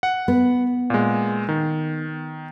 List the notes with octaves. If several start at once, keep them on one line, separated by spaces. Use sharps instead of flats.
F#5
B3
A#2 G#3
D#3